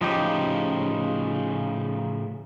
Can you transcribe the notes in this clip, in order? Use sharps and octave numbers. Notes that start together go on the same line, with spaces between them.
A2 C#3 F3 D#4 G4